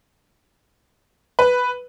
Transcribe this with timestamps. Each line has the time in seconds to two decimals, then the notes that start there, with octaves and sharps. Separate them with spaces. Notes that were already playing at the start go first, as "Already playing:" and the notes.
1.39 B4